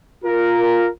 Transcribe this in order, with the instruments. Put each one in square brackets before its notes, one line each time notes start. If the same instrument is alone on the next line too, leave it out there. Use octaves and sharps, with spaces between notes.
[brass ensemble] F4 A#4